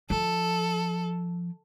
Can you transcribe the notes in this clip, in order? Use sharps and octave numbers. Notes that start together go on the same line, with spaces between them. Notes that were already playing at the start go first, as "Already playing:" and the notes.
F3 A4